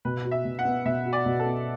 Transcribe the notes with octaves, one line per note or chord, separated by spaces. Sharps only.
B2 B4
F#4
E5
B2
F#5
B3
B2 E5
F#4
D5
B2
A4
B3